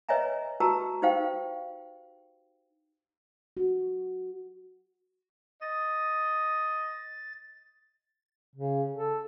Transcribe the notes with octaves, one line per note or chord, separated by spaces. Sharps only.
B4 C#5 D#5 E5 G#5 A#5
F#4 G4 B4 A5 A#5 E6
D#4 G4 C5 F5 G5
F#4
D#5 A6
C#3
A4